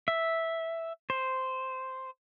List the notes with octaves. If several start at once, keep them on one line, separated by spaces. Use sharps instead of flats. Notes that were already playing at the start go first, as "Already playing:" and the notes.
E5
C5